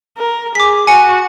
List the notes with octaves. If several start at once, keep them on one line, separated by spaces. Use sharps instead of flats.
A#4
G#4 D6 B6
F#4 G#5 C#7